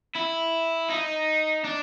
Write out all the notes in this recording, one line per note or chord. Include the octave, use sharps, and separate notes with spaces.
E4
D#4
D4